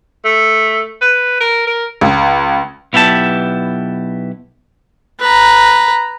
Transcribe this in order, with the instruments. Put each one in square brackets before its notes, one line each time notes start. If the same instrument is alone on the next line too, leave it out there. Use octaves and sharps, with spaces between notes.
[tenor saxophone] A3
B4
A#4
A#4
[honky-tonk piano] C#2
[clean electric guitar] B1 B3 E4 G4 A5
[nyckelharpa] B4 A#5